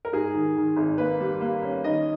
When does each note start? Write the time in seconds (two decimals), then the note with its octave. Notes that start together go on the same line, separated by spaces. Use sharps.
0.05 A#4
0.12 G#2 G#4
0.34 D#3
0.56 D#3
0.77 G#1
0.98 A#3 B4
1.21 G3
1.41 A#3
1.63 C#4
1.84 D#3 D#5